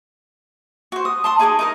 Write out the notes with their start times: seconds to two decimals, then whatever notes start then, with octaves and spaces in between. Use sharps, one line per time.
0.92 F#4 C5
1.05 D#6
1.24 A5 C6 D#6
1.39 D#4 G#4 F#5 D6
1.59 D#4 A#4 D#5